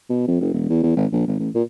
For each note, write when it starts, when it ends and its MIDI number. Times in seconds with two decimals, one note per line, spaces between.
0.10 0.27 47
0.27 0.39 41
0.41 0.52 30
0.54 0.66 28
0.70 0.81 40
0.83 0.94 40
0.97 1.06 32
1.12 1.25 34
1.27 1.35 32
1.39 1.50 33
1.55 1.63 46